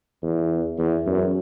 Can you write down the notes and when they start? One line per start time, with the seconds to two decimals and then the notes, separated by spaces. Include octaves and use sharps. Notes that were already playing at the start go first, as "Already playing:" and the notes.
0.22 E2
0.78 E2
1.06 F#2